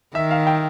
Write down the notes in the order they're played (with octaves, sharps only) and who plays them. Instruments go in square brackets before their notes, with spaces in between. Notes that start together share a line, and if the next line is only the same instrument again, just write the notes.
[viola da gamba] D#3 [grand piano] E5
[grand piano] F5
G5